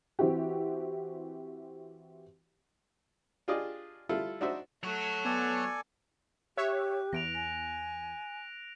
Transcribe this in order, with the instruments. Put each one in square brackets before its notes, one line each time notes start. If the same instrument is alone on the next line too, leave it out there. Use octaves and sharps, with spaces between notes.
[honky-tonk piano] E3 C4 E4 F#4 G4
[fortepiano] D4 F4 G4 G#4 D5 D#5
G3 E4 F4 A4
D4 D#4 F#4 C5 E5
[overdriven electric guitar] F#3 F#4 [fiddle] A3
[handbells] B3 [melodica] A4 D5 G#5
[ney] G4 [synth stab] C#5 E5 [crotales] F#6
[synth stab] E2 [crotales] A#6 D7 F7
[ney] G#5 [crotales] A#6